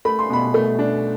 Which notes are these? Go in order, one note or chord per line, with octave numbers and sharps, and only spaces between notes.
A3 B5
C6
B2 B5
A3
D4